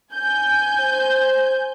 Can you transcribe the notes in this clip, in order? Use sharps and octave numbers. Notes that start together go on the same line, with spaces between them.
G#5 G6
C5